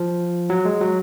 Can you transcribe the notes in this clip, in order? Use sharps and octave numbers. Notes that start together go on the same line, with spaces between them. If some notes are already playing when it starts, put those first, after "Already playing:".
Already playing: F3
F#3
G#3
F#3